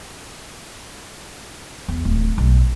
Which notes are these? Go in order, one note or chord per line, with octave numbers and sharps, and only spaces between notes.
E2
D1
B1